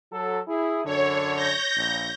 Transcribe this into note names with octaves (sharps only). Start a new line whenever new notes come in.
F#3 A4
E4 G#4
F#2 D3 C#5
G6 A#6
A#1